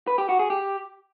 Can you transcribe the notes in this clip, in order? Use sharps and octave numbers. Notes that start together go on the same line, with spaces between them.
B4
G4
F#4
G#4
G4